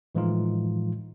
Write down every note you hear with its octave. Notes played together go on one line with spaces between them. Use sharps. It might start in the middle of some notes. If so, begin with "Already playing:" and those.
A2 E3 F3 G#3 D#4 F4